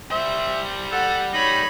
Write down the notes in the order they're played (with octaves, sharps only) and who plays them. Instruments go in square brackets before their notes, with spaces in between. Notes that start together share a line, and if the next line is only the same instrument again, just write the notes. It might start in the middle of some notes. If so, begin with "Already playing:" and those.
[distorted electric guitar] G3 C5 [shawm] E5
[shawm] A4 [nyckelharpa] F#5
[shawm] D#4 [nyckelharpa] C#5 B5